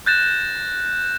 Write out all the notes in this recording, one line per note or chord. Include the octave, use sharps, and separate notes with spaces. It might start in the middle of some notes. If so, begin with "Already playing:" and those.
F#6 G6 A6 A#6 E7